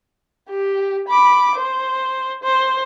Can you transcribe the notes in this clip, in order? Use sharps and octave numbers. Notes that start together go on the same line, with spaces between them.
G4
B5 D6
C5
C5